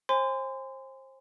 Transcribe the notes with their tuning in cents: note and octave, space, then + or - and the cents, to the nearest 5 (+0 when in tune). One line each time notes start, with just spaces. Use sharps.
C5 +30 G#5 -25 C6 -30